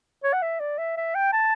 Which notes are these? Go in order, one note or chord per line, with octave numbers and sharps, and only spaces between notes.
C#5
F#5
E5
D5
E5
E5
G5
A5